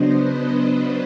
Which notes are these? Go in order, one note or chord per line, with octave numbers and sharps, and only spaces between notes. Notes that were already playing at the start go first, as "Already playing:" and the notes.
Already playing: C#3 F#3 B3 D4 C5 D#5
B4